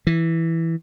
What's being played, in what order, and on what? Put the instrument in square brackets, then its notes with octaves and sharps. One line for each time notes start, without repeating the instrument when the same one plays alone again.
[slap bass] E3